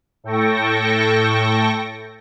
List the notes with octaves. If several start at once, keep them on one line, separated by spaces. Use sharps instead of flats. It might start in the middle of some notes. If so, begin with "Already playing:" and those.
A2 A4 G5 C#6 A#6